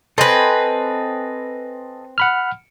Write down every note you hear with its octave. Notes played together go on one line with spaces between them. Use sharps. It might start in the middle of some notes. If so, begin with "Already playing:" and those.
C4 A4 B4 D#5 G#5
F#5 B5 F6